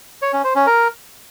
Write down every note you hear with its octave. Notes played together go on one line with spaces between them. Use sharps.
C#5
C#4
C5
C#4
A#4